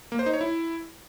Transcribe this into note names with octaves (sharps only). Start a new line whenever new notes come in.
A#3
C5
D#4
C#5
E4